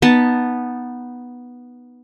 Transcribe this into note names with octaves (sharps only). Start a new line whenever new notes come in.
B3 D#4 A5